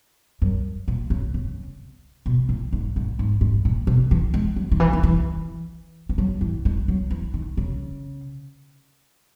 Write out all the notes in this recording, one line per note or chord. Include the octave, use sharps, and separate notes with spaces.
F#2
A#2
C#3
C#3
B2
A#2
G#2
G#2
G#2
G#2
A#2
B2
E3
G#3
F#3
D#3
E3
D#3
E3
E3
F#3
E3
G#3
F#3
E3
D#3
C#3